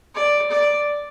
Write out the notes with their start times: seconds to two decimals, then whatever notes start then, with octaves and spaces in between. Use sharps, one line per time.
0.15 D5
0.51 D5